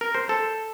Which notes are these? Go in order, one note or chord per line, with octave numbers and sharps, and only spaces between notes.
A#4
C5
A4